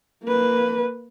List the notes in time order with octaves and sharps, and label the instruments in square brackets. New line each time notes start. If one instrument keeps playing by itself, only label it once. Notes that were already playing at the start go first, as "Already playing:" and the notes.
[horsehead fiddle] A#3 B4